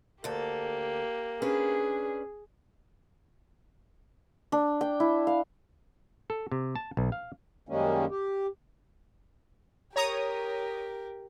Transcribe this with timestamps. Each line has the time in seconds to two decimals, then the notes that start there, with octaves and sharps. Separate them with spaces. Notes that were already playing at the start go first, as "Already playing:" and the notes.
0.24 D2 A#3 G4 A4
1.42 C#4 D4 G#4 B4
4.52 D4
4.81 G5
5.00 E4
5.27 F5
6.30 A4
6.51 C3
6.76 A5
6.97 B1
7.12 F5
7.69 F#2 D#3 G3 G#3 A#3 C#4
8.10 G4
9.96 G4 A#4 C#5 A#5 D#6